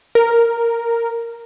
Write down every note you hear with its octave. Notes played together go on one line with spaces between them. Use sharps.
A#4